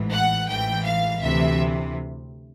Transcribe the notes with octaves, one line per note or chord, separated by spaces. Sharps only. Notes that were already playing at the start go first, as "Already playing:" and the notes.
Already playing: A1 G#2 E3
F#5
A1 G#2 E3 G5
F5
D2 C3 E3 E5